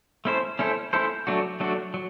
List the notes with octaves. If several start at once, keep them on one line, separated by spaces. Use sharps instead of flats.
A3 C#4 E4 A4 C5
A3 C#4 E4 A4 C5
A3 C#4 E4 A4 C5
F#3 A3 D4 F#4
F#3 A3 D4 F#4
F#3